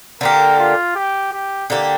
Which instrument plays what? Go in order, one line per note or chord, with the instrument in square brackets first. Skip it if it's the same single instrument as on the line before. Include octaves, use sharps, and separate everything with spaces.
[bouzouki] D3 A#3 G4 [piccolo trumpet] A#4
[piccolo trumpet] F4
G4
G4
[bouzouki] D3 A#3 G4